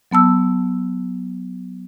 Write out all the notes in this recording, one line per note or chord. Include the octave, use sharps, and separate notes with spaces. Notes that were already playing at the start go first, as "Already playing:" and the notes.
F#3 B3 A5 E6